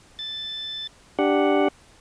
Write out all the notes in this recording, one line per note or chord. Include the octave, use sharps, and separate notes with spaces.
A6
D4 G4 F#5